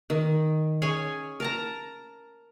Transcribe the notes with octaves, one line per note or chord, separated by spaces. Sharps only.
D#3
C#4 G#4 C#5 G#5
A#4 A5 A#5